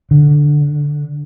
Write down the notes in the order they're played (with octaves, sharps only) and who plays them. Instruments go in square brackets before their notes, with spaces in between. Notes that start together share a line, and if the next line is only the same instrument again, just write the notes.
[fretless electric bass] D3